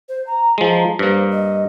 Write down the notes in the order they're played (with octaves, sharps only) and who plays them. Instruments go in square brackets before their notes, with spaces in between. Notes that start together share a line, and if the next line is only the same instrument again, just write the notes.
[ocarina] C5
A#5
[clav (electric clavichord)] F3 G#3
[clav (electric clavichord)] G2 A#3 [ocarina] C5
[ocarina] D#5